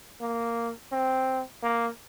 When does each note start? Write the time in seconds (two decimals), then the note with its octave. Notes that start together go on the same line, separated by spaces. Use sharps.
0.21 A#3
0.92 C4
1.62 A#3